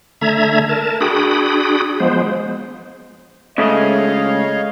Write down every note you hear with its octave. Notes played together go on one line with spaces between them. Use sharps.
D3 A3 E5 A#5 G#6
A#4 A5
D4 F#4 G#4 G5 B5 D#6
F3 G#3 B3 C5
C#3 G#3 A3 C#5 D#5 F5